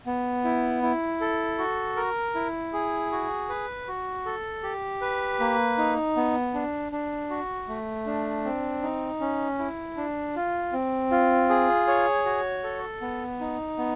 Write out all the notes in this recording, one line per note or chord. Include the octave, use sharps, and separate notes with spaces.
B3
E4
E4
A4
F#4
A#4
E4
G#4
F#4
B4
F#4
A4
G4
B4
A#3
D#4
B3
D4
D4
F#4
A3
D4
C4
D#4
C#4
E4
D4
F4
C4
F4
G#4
C#5
F#4
A4
B3
D#4
B3